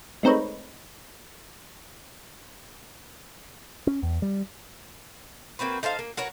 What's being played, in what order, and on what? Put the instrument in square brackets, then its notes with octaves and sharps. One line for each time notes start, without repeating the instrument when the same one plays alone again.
[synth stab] G#3 A3 C4 D#4 B4 C#5
[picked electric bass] C#4
E2
G3
[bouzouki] A#3 C4 F#4 B4
D#4 A4 C5 F5
A#3
F#4 A#4 B4 C#5